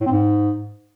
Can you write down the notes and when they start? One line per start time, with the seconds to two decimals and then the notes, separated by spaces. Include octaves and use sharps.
0.01 A2
0.06 C4
0.11 G#2